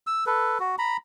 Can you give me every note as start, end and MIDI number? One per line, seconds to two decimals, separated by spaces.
0.07 0.24 88
0.26 0.58 69
0.26 0.58 71
0.60 0.76 66
0.78 0.97 82
0.78 0.97 83